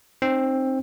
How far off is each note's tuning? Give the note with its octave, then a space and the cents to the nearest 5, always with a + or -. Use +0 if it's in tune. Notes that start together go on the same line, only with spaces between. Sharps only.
C4 +15 D#4 -25